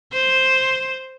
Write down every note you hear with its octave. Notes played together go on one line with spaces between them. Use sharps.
C5